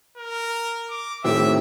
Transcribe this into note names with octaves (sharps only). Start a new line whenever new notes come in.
A#4
D6
A2 D#3 C4 F#4 G#4 E5